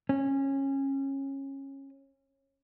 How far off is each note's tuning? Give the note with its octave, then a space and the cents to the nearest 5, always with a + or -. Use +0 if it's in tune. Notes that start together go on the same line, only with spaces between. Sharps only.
C#4 -20